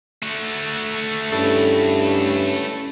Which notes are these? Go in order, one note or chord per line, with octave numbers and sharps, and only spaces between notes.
A3 F#4
G2 C#4 E4 A4